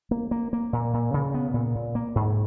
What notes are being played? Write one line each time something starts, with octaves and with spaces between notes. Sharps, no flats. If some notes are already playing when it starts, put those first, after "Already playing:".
A#3
A#3
A#3
A#2
A#2
C#3
B3
A#2
A#2
A#3
G#2